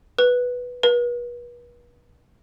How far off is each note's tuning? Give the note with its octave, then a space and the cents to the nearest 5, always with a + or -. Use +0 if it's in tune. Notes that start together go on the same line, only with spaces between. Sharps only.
B4 -5
B4 -40